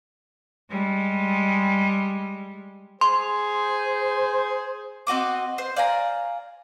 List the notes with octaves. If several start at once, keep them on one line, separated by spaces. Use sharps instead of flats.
G3 G#3
G#4 C5 C6
C4 F#4 D#5 D6
C5
D5 F5 G#5 A#5